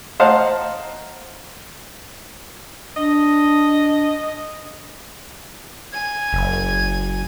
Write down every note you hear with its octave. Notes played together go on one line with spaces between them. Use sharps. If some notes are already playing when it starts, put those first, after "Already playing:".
C5 D#5 F5 F#5 A5 A#5
D4 D#5
G#5 G#6
F#1